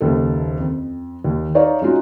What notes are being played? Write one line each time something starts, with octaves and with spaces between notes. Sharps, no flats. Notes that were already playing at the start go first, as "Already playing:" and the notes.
F#1 D#2 A4
F2
D#2
D#4 C#5 D5 F5
G#3 C#4 D#4 F4 F#4